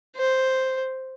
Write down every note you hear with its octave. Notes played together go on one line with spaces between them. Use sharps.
C5